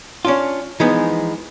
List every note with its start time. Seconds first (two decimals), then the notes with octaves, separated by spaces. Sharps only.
0.25 C#4 D4 F4
0.80 E3 F3 G#3 B3 D#4